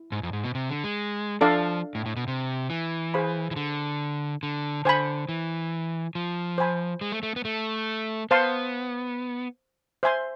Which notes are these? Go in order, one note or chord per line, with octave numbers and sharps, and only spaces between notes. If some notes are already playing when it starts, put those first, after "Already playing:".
Already playing: E4
G#2
F2
G#2
B2
C3
D3
G#3
F3 D4 A4 D5 F5
A2
A2
B2
C3
E3
G#4 C5 F5 B5
E3
D3
D3
D3 C5 G#5 B5
E3
F3
C5 G#5 B5
G#3
A3
A3
B3
A3
B3 C5 F5 A5 C6
C5 E5 G#5 C6